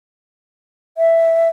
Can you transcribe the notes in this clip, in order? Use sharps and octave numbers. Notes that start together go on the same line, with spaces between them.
E5